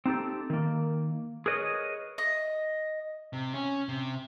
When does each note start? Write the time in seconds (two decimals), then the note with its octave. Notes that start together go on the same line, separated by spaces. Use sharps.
0.06 C4 D#4 G4 A4
0.50 D#3 A#3
1.46 G#4 A#4 B4 C#5 D#5
2.18 D#5
3.33 C3
3.54 C#4
3.89 C3